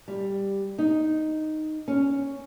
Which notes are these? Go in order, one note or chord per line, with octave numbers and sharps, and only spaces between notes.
G3
D#4
C#4